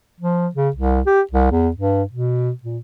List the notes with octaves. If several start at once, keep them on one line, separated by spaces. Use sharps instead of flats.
F3
C#3
C2
G4
C2
E2
G2
B2
A#2